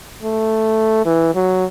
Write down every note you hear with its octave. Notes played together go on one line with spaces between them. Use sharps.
A3
E3
F#3